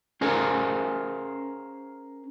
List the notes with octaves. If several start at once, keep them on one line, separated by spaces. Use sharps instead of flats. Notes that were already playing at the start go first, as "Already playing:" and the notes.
C#4 G#4 A#4 C5 F5 G#5